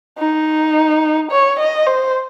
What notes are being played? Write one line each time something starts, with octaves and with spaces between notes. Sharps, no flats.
D#4
C#5
D#5
C5